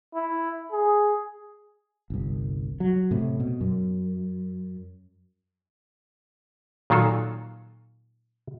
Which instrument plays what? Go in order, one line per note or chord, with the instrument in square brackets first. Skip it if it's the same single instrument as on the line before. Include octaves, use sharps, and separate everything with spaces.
[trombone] E4
G#4
[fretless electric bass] G1 C2
F#3
A2 C3
B2
F#2
[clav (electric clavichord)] A#2 D#3 F#3 F4 A4